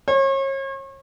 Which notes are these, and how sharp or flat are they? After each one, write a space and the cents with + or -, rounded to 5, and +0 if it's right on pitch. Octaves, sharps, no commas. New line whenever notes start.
C#5 -35